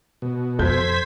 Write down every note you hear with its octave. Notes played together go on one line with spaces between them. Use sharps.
B2
F2 A4 C5 G6 G#6 B6